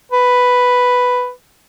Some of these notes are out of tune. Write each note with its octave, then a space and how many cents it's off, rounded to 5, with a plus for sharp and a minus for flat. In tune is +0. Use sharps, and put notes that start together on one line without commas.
B4 +5